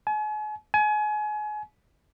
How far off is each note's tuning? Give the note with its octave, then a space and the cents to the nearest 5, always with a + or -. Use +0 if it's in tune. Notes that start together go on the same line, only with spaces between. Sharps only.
G#5 +40
G#5 +30